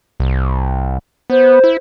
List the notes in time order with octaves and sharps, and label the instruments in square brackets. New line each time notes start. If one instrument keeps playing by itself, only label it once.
[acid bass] C2
[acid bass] B3 [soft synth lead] C5
[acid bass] E4